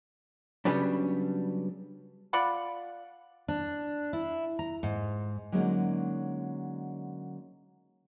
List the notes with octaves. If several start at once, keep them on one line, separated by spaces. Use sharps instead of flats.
C#3 F#3 G3 B3 C#4 D4
F4 D5 F#5 B5
D4
E4
A#5
G#2
D3 F#3 G#3 A#3 C#4 D#4